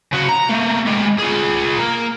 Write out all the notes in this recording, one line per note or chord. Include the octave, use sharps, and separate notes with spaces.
C#3 F#4
A#5
A3 A#3
G#3 G4
F4 G#4
A#3